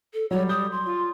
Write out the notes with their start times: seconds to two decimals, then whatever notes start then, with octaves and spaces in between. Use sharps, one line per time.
0.14 A4
0.31 F#3 G3 C#5
0.49 D#6 G6
0.71 C6
0.86 F4